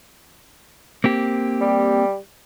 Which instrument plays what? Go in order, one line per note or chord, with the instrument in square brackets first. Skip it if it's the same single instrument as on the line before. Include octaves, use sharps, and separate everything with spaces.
[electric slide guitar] A#3 C4 G4
[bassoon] G3